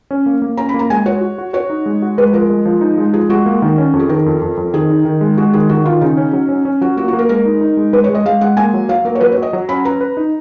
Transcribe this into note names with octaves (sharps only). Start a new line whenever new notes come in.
C#4
A#3
A#3
C#4 A#5
B5
A#3
A#5
G#3 G#5
F#4 C#5
F#4
F#4
F#4 C#5
D#4
G#3
F#4
G#3 B4
F3 A#4
G#3
F3
D#4
G#3
F3 G#4
G#3 F#4
A#3
D#3
C#4
F2
G#4
D#3 A#4
F2
F2
F2
D#3 G#4
D#4
D#3
G#3
G#3 F#4
D#3 G#4
D#3 F#4
D#3 F4
C#3 D#4
C#4
F#3
C#4
C#4
F#3 F#4
A#3 F#4
F#4
A#3
A#4
G#3 A#4
D#4
D#4
G#3
G#3 B4
C#5
G#3
D#5
G#3 F5
G#3 F#5
A#3 G#5
F#3
F#3 F5
A#3 A#4
C#5
F#3 B4
C#5
F#3 D#5
F#3
C#4 B5
B4 A#5
B4
D#4